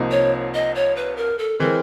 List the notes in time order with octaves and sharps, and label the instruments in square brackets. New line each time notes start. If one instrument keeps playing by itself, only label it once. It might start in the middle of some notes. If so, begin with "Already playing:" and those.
Already playing: [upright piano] C2 C3 F3 A#3 D#4
[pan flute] C#5
D#5
C#5
B4
A#4
A4
[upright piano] E3 G#3 C4 [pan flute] A#4